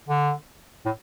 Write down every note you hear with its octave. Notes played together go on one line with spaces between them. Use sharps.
D3
A2